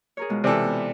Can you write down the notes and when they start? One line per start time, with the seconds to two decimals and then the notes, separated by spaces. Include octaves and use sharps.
0.17 G#4 A#4 C#5
0.29 B2 G#3 F4
0.44 C3 E3 F4 A4 D5
0.64 B3